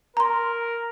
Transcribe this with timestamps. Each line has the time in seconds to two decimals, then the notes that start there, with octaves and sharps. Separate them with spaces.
0.17 A#4 A#5 C6